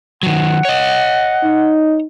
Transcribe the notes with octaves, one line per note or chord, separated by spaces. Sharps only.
D#3 F#3 F#5
C#5 D#5
D#4